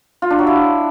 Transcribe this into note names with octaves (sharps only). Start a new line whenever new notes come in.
F4
D4
F#3
E4